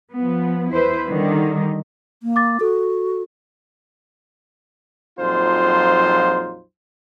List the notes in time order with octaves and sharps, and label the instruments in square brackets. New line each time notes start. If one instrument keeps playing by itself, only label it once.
[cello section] F3 B3
E2 E4 B4 C5
D3 D#3 G3 D#4
[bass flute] A#3
[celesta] D6 A6
[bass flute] F#4 [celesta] A4
[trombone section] A#1 F2 F#3 D#4 F4 C5